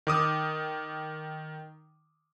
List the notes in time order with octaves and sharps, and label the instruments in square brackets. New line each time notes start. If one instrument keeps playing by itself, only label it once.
[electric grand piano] D#3 D6 D#6